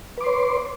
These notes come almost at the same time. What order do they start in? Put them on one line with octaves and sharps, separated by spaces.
B4 D6 C6 C#5